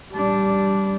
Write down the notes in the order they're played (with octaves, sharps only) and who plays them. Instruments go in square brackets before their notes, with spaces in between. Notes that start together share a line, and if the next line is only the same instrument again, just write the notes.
[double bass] G3 D4